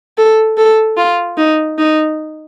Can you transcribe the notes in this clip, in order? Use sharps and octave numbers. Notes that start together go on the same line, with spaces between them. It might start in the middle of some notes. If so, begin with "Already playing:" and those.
A4
A4
F4
D#4
D#4